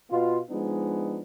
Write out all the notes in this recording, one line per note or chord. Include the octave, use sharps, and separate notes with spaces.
B2 B3 F4
F3 G#3 B3 D4 D#4